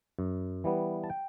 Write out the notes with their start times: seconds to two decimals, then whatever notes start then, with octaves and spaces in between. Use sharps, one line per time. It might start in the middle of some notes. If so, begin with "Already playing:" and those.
0.19 F#2
0.64 E3 G3 B3
1.04 A5
1.10 G5